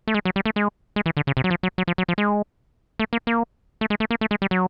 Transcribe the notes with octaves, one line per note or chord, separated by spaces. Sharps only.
A3
G#3
F#3
G3
A3
G#3
G#3
E3
D3
C#3
C3
F#3
F3
F#3
F#3
F3
F#3
F3
G#3
A3
A#3
A#3
A3
G#3
A3
A#3
A3
G#3
G3
F#3